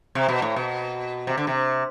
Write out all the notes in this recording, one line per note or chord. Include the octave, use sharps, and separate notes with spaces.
C3
B2
A2
B2
C3
D3
C3